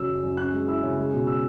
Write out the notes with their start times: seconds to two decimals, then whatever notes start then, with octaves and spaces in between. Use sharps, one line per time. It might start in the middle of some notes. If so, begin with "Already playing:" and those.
Already playing: C#3 F#3 E6
0.08 F#2
0.24 F#2
0.37 C#4 F#6
0.53 G#3
0.68 E4 E6
0.83 C#3
0.97 G#3
1.13 B2
1.27 E6